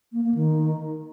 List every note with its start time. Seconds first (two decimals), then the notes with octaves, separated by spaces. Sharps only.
0.13 A#3
0.24 A#3
0.35 D#3